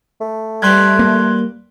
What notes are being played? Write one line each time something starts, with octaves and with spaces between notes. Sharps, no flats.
A3
G3 B4 C6 F#6 G#6
A#3